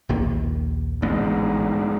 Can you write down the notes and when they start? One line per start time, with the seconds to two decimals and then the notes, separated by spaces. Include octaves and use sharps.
0.09 A#1 D#2 A#3
1.02 A1 D2 G#2 B3